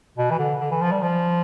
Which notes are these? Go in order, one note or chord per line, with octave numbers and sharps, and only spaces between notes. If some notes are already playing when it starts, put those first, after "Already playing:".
B2
E3
D3
D3
E3
F3
G3
F3